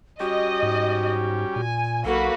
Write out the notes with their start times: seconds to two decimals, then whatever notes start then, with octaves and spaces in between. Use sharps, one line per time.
0.20 G3 C#4 F#4 G4 D#5
0.62 G#2
1.56 A#2 G#5
2.05 B1 A#3 F#4 A4 B4